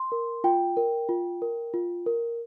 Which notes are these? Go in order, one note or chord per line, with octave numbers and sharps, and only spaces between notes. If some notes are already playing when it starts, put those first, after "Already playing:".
Already playing: C6
A#4
F4 G5
A#4
F4
A#4
F4
A#4